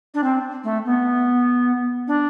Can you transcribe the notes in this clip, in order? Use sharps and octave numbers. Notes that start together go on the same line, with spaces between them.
D4
C4
A3
B3
D4